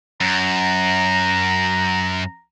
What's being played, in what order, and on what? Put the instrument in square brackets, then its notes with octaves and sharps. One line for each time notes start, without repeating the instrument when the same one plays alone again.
[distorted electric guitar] F#2 [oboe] A#5